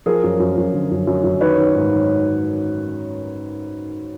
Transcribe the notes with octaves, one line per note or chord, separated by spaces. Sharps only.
F3 G#4 A#4
F#2
F#2
F#2
D3
F#2
F#2
F#2
D#3 B4 C#5
D#3
G#2
D#3